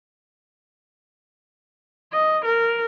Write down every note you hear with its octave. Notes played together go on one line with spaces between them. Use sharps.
D#5
A#4